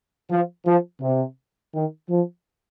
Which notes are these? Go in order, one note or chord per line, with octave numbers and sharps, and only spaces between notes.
F3
F3
C3
D#3
F3